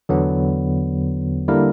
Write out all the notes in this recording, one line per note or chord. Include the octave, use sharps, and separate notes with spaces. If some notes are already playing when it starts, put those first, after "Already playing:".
E2 D3 F#3 B3
D3 G3 A#3 E4 A#4